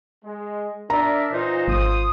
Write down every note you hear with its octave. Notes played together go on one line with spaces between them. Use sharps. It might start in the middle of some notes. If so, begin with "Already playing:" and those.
G#3
D4 A#4 D5 E5 A#5
A#2 E3 D#4 F4 C5
G#1 D#6